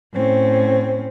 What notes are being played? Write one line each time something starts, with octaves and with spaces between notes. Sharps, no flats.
A2 C4 C#4